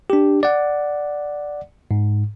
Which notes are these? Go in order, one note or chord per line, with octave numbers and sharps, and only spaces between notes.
D4 G4
D5 F#5
G#2